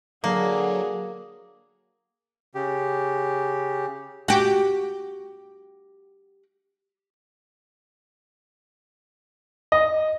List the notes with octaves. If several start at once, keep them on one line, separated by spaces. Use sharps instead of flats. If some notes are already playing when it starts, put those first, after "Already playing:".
D3 F#3 A#3 G#4
C#3 G4
F#4 G4
D#5